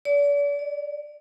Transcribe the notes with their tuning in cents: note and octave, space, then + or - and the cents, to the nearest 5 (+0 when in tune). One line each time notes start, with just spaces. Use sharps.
D5 -40
D5 +20